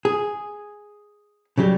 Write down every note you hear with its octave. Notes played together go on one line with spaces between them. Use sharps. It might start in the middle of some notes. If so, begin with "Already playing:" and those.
G#4
C#3 F#3 G3